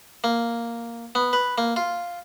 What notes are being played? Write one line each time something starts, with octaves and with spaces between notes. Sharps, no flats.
A#3
B3
B4
A#3
F4